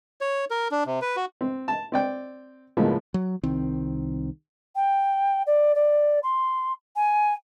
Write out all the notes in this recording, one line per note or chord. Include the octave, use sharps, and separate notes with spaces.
C#5
A#4
D4
C3
B4
F#4
C4
A5
C4 D5 G5
C#2 A2 F3 G#3 A#3 B3
F#3
C2 D#3 C4
G5
D5
D5
C6
G#5